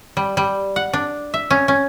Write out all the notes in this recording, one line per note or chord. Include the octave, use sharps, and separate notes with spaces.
G3
G3
F#5
D4
E5
C#4
C#4